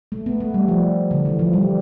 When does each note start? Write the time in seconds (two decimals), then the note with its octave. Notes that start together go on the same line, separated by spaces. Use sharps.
0.12 A3
0.26 B3
0.40 A3
0.54 G3
0.68 F3
1.11 D3
1.25 E3
1.39 F3
1.53 G3